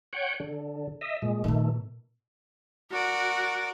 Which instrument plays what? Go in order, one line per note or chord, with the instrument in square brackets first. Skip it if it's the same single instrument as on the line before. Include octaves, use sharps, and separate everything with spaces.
[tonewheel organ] C#5 F#5 G5
D3
D#5 E5
A#2 G#3
[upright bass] A#2 B3 [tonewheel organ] D#3 A3
[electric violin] F#4 [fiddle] A#4 D5